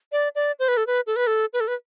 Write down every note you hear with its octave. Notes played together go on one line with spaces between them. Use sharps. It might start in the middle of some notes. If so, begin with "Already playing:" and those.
D5
D5
C5
B4
A4
B4
A4
B4
A4
B4
A4
B4